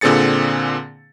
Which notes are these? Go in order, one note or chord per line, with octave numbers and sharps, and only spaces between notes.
A#2 D3 C4 G#4 A6 C#7